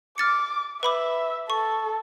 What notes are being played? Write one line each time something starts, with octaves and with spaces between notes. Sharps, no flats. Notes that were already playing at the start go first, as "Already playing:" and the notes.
D6 F6 A6 C#7
B4 E5 B5 D6
A4 C#6